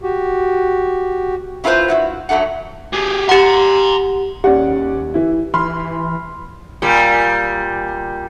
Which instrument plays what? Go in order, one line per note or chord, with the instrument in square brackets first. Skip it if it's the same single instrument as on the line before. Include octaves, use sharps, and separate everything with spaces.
[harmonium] F#4 G4
[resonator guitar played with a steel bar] C#4 E4 F4 G4 B4 C5
G2 E4 F#4
F#2 F#3 A3 D4 F#5
[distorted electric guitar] G4 G#4
[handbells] G4 F#5 [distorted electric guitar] A#5 C6
[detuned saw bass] D#2 [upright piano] C#4 D5 F#5 [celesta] G4
[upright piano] E3 E4
[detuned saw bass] E3 [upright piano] B5 C6 F6
[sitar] A#2 G3